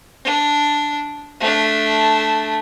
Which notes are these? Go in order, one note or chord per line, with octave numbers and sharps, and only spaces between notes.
D4
A3 D4